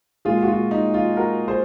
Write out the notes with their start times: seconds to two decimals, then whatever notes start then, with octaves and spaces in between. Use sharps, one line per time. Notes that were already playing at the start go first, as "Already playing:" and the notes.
0.25 A#2 G#3 F4 G#4
0.43 F#4
0.48 F4
0.71 D#4
0.94 F4
1.17 F#4 A#4
1.48 G#4 C5